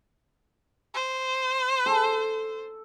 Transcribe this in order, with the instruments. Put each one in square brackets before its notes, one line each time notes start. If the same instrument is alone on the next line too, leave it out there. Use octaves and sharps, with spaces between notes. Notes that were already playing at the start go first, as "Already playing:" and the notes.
[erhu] C5
[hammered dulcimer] A4